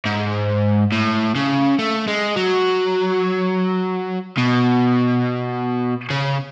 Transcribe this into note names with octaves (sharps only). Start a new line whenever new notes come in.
G#2
A2
C#3
A3
G#3
F#3
B2
C#3